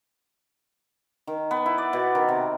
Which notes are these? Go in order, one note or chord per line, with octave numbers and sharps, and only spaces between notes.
D#3
B3
E4
D5
B2
D#3
C3